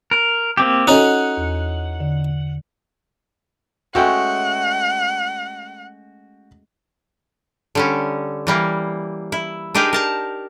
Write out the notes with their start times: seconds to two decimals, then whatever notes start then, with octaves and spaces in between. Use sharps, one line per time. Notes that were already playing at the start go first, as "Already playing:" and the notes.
0.11 A#4
0.57 A#3 C4 G4
0.87 C#4 D#4 F#4 A4 F#5
1.37 E2
2.00 D3
3.95 G#3 A3 C#4 F#4 F#5 G5
7.75 D3 G3 C#4
8.47 E3 G3 A#3
9.32 E4
9.75 D4 D#4 G4 G#4 A#4 B4
9.93 A#4 A5 A#5